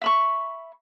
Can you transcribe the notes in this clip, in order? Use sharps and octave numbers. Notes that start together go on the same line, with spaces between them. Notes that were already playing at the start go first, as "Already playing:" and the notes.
E5 B5 C#6